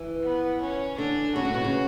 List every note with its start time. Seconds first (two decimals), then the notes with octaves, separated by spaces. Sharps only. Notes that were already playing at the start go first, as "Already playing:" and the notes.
Already playing: E3
0.23 B3
0.61 C#4
0.98 D3 D4
1.35 C#3 F#4
1.45 A2
1.54 B2
1.64 C#3